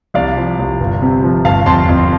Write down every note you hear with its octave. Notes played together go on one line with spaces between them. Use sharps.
C2 D5 F5
F3
C2
G1
C3
F3
G1 F5 A5
F2 A5 C6
F2